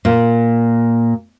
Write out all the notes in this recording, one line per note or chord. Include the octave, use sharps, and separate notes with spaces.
A#2